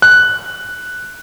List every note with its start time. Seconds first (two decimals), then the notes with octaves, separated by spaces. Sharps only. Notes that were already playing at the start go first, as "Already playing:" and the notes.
0.02 F#6